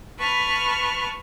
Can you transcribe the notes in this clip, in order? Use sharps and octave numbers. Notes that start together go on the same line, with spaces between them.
B4 A5 B5 C#6 F6 F#6